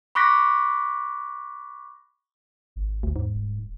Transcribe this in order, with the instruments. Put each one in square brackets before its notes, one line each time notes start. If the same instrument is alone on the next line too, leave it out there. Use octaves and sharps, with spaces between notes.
[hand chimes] B5 C#6 D6 F#6 A#6 B6
[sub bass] G#1
[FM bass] D2
[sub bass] E2 [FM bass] G#2
[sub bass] D#1